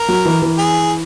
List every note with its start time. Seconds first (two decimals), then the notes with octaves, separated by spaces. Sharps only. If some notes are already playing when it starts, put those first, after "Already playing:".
Already playing: A#4
0.08 F#3
0.25 E3
0.42 E3
0.58 G#4